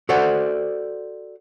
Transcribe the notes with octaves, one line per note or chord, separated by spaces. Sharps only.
F#4 A4 C5 D5 F#5